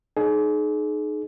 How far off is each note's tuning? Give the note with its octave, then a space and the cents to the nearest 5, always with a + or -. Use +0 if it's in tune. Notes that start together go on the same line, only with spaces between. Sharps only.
D#4 -25 G#4 +35